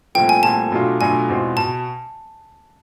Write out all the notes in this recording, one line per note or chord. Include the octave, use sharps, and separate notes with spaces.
C2 A#2 F3 A3 G5
G#5
C2 A#2 F3 A3 A5
B2 F#3 A3 D4 F4
B2 F#3 A3 D4 F4 G#5
E2 B2 G#3 C4 F4
B2 A5